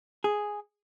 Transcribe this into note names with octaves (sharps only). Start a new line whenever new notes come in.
G#4